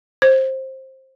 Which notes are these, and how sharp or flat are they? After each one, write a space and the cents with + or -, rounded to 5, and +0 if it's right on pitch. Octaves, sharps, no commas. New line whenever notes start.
C5 +15